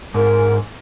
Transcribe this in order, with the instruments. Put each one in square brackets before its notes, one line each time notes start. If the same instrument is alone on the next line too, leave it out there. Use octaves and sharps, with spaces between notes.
[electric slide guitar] G#2 [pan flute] A#4